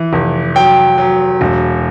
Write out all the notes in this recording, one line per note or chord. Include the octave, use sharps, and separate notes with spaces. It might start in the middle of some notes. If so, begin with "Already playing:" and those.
Already playing: E3
F1
F#3 G5
F#3
E1